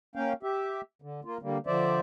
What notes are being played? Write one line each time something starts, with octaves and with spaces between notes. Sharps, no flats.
A#3 C#4 F5 G5
G4 E5
D3
A#3 F4
D3 G3 A#3
D3 F3 C5 D5 E5